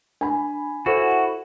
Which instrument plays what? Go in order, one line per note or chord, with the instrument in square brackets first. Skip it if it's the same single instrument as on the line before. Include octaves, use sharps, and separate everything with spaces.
[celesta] D4 [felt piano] G#5 B5
[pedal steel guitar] E4 F#4 [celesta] A4 C5 F#5